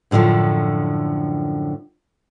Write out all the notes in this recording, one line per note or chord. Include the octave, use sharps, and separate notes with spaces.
F#2 A2 D3 D#3 F3